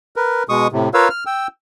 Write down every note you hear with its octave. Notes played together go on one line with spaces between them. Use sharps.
A#4 B4
B2 G#3 C#6 D#6
A2 C3
F4 A#4 B4 C#5 F5 E6
F6
G5 E6